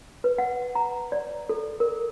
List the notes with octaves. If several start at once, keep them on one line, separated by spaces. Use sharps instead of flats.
B4
F#5
A#5
D5
A4
A#4